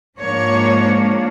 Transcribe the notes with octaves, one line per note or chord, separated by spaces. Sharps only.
G#2 F3 A#3 D4 C#5